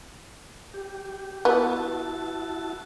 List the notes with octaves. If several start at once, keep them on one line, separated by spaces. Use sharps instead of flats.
G4
B3 E4 F#4 A5